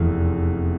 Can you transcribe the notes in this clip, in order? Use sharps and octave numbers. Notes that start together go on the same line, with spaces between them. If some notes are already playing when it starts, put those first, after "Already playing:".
Already playing: F1 E2 E3